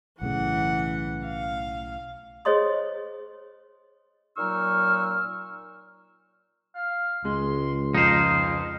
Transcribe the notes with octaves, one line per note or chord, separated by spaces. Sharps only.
B1 A2 C#3 E3 F#5
F5
G#4 C5 C#5 D#5 C6 D#6
A#2 F#3 D#4 C#6 E6 F6
F5
C#2 G#3 C6
F2 D#4 C5 F5